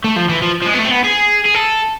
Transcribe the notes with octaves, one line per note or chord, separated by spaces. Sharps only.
A3
F3
E3
F3
F3
G#3
B3
A3
C4
B3
G#4
G#4
A4